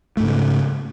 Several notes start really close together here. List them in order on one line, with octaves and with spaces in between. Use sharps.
A3 G#2 C#3